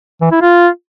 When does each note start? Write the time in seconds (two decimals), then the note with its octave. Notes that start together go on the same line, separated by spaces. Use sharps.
0.21 E3
0.31 E4
0.41 F4